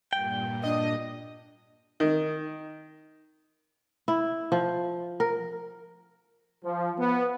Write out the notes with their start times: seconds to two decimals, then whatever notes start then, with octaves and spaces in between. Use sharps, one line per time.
0.13 G2 A#2 G5
0.63 D4 D#5
2.00 D#3
4.08 E4
4.52 F3
5.20 A#4
6.64 F3
6.98 B3